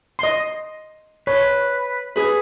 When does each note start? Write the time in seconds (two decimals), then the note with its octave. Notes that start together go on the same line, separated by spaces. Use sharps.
0.19 D#5 C6
1.27 B4 C#5
2.16 G#4 B4